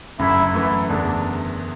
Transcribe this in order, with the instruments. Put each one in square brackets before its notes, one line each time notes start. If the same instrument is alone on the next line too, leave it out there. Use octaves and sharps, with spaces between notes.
[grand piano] F#1 F#2 D3 F#3 [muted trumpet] E4
[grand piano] F#2 E3 A3 [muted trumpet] E4
[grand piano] F#1 E2 D3 A3 [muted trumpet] D4